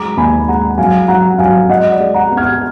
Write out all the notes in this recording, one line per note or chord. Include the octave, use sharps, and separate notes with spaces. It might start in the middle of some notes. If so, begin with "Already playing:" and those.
Already playing: F#3 G#3 A#5 D6
D#2 G#5 B5
G#3 F#5 A#5
F#3 F5 G#5
F#3 F#5 A#5
F#3 F5 G#5
G#3 D#5 F#5
D5
G#3
F#5 A#5
B3
F6 G#6